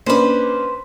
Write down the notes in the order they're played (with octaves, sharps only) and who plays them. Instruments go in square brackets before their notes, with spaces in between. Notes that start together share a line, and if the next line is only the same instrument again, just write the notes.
[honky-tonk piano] A#3 C#4 D4 [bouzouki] B4 C5